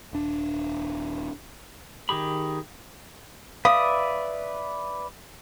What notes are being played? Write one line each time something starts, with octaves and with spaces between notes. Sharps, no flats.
D#1 D4
D#3 G4 G#4 B5
B4 D5 E5 F5 D#6